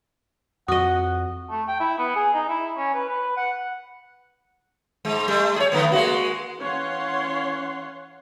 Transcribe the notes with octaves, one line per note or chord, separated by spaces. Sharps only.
F2 F#4 D#5 F#5 D#6
A3
G5
E4
B3
G#4
D#4
E4
C#4
B4
B4
F#5
G#2 G#3
G3 A3
G#4 C#5
D3 A3 B3
G#3 A#3 F#4
E3 C#4 C#5 F5 F#5 C6